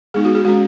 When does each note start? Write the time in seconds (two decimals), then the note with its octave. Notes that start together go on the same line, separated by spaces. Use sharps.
0.14 G#3 B3 D#4 G#4
0.25 F#4
0.35 G#4
0.45 G#3 C#4 F#4